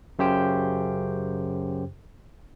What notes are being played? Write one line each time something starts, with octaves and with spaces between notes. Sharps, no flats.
F#2 C#3 G4 C5 G5